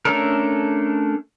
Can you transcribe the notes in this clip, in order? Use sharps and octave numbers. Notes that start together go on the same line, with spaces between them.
A3 C#4 D4 A4 A#4